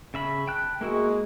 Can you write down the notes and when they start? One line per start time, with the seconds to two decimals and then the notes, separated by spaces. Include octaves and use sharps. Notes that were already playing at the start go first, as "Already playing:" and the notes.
0.14 C#3 E5 B5
0.47 G5 A5 F#6
0.81 G#3 A#3 E4 F#4